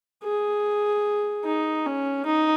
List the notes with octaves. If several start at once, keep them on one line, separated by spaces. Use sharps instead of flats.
G#4
D#4
C#4
D#4